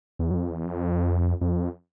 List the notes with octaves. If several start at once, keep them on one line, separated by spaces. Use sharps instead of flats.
E2
F#2
F2
E2
F2
F2